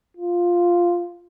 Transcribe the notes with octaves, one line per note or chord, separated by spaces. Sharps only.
F4